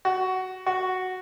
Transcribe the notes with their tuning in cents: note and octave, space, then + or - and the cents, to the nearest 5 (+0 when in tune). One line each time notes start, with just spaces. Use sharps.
F#4 +10
F#4 +0